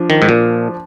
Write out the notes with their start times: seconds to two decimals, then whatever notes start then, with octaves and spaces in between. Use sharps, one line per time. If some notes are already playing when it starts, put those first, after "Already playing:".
Already playing: F3 D4
0.10 D#3
0.22 G#2
0.29 A#2